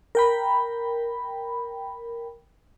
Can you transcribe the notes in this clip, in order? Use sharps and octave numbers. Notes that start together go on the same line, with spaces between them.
A#4 G5 B5